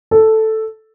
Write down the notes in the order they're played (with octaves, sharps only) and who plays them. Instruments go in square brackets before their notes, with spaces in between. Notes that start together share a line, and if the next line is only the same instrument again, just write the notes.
[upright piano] A4